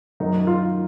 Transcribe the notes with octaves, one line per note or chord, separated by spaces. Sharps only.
F#2 D#3 F#3 D#4
F4